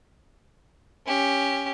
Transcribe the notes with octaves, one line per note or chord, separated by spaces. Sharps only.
C#4 G4